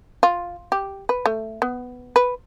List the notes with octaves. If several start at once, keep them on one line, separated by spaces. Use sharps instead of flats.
F4
G4
B4
A3
B3
B4